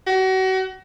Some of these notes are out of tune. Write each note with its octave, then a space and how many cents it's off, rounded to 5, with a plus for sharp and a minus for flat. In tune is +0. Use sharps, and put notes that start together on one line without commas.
F#4 +35